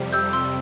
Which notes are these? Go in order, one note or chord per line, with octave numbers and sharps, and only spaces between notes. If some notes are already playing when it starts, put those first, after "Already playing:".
Already playing: F2 C3 G3
E6 G6
C6 E6